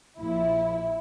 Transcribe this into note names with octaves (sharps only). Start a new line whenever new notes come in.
A#1 A#2 F3 E4